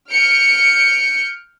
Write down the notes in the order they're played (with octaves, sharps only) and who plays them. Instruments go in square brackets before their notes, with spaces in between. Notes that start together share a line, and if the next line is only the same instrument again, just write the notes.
[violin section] F6 G6 C#7 D7